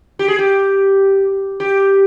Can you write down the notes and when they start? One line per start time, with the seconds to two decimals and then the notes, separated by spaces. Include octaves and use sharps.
0.19 G4
0.28 G#4
0.39 G4
1.60 G4